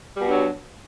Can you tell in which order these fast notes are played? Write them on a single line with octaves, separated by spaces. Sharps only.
G3 B2 G2 F#3